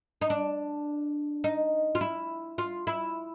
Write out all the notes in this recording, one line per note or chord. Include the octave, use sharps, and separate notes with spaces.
D#4
D4
D#4
F4
E4
F4
E4